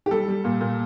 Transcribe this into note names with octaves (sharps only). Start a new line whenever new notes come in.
G4
G3 A4
G3
A#2
A#2